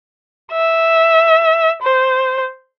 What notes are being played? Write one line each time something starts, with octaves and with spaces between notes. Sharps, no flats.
E5
C5